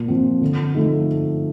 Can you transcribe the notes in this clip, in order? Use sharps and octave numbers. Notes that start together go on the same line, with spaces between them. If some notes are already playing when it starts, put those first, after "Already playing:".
Already playing: A#2
F3 C4
D3
F3 A3 D#4